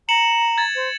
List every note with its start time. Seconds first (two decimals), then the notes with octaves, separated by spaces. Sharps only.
0.09 A#5 C#7 E7 F#7
0.58 G#6 A6
0.76 C5